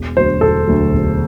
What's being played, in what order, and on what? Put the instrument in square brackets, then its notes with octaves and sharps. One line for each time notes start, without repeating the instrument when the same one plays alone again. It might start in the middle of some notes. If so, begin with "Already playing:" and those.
Already playing: [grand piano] E1
D2 D3 F#3 C5
E1 A4
D2 D3 F#3
E1